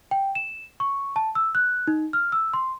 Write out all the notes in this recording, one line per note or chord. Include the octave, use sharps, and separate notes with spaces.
G5
E7
C#6
A5
E6
F#6
D#4
F6
E6
C6